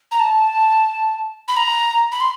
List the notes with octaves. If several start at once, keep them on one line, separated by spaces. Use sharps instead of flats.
A#5
A5
B5
A#5
B5
C6